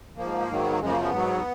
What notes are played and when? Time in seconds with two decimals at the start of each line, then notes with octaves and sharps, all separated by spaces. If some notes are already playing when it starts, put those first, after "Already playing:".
0.17 G#2 F3 A#3
0.48 G#2 D#3 F#3
0.63 B3
0.72 A#3
0.79 F#2 C#3 F3 G#3
0.90 A#3
1.00 B3
1.11 G#2 F#3